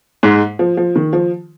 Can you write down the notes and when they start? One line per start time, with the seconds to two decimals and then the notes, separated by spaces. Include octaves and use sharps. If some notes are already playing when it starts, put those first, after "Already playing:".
0.23 G#2 G#3
0.59 F3
0.77 F3
0.96 D#3
1.13 F3